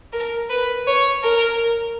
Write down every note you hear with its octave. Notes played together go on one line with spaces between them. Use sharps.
A#4
B4
C#5
A#4